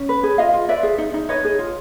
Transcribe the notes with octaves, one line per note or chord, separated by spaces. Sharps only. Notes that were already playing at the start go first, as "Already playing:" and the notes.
Already playing: C#4
B4
G#4
F4 D#5 F5
F4
B4 D5 E5
G#4
D#4
D#4
B4 C#5 D#5
G#4
F4